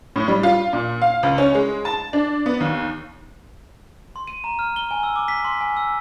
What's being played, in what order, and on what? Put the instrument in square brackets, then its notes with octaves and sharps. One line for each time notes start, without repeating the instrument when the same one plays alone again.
[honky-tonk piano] A2
G3
F4
A#2
F5
C#2
C#4
G#3
A5
D4
B3
D#2
[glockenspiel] C6
D#7
A#5
F6
G7
G#5
E6
D6
B6
C6
G#5
E6